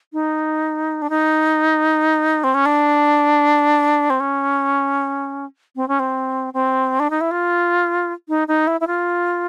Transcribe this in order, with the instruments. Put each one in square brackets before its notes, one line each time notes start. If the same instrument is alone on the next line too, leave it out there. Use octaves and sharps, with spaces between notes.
[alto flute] D#4
D4
D#4
C4
C#4
D4
C4
C#4
C4
C#4
C4
C4
D4
D#4
E4
F4
D#4
D#4
E4
E4
F4